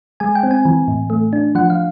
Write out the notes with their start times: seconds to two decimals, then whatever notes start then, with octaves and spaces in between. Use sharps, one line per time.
0.20 G#3 G#5
0.35 G5
0.43 C4
0.51 G#5
0.65 E3
0.88 A2
1.10 A3
1.33 D4
1.55 F3 F#5
1.70 F5